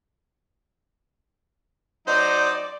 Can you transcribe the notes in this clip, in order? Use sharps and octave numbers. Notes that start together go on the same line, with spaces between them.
F#3 D#4 C5 D5